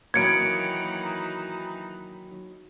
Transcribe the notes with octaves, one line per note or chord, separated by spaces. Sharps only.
D#3 E3 F#3 A#3 D#4 G#6 C#7 D7